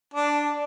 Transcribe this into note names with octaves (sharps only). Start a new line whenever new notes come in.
D4